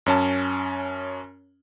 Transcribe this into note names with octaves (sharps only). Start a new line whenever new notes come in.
F#2 C#4 A5